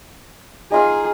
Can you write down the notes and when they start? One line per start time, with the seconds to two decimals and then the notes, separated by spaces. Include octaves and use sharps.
0.72 D#4 F4 G#4 F5